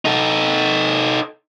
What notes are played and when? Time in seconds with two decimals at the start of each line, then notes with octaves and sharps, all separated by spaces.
0.05 D#4 A4